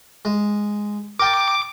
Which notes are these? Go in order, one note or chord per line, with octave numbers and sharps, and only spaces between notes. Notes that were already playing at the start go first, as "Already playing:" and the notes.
G#3
A#4 G5 A5 D6